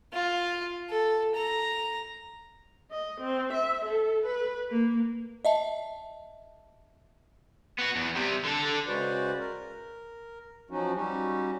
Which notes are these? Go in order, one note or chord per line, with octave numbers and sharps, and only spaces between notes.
F4
A4
A#5
D#5
C4
E5
A4
B4
A#3
D#5 E5 A5
B3 F#4
E2
C3 G3
D3 A4
C#3 G#3 F#4 B4 C5 D5
A#4
F3 F#3 C#4 D#4 F#4
G3 C#4 D#4 F#4 G4